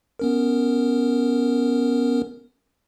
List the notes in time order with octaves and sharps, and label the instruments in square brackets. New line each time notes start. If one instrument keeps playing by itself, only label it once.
[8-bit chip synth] B3 C#4 A#4